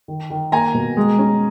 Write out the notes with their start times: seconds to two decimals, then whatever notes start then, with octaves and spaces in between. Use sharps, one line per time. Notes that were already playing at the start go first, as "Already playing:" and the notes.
0.08 D#3
0.30 D#3
0.52 A#3 G#5 A#5
0.74 B2
0.97 G#3
1.19 C#4